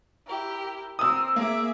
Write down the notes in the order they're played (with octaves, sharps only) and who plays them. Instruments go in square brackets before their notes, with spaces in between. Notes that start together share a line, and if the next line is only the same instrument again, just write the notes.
[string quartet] E4 G4 A#4
[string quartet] C4 A#4 [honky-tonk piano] D#6 E6
[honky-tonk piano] A#3 [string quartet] G#4 E5 D6